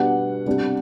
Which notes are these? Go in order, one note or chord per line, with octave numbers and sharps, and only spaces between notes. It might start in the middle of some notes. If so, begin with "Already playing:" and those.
Already playing: B2 G3 B3 D4 F#5
C3 G3 D4